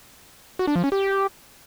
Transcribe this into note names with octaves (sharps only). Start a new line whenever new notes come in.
F#4
D4
F3
C#4
G4